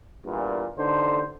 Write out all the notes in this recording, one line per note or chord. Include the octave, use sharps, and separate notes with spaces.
E2 G2 A#2
A1 D3 D#4 C5